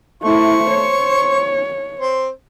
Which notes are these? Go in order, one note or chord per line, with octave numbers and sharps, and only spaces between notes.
A3 E4 C5 C#6
C#5
C4 C5